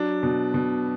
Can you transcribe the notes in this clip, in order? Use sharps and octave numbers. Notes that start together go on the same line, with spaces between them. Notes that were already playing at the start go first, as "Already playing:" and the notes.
Already playing: F#3 D4
B2
B2